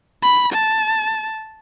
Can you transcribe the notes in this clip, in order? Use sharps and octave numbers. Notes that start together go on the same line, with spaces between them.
B5
A5